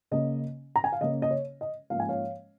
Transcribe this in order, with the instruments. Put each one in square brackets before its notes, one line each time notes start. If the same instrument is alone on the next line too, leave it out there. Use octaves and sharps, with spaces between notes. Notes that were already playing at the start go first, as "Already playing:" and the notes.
[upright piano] C#3 A#3 C#4 D#5
A#5
G#5
F5
C#3 A#3 C#4 D#5
D#5
C#5
D#5
G#2 F3 A#3 C#4 F5
G#5
C#5 F5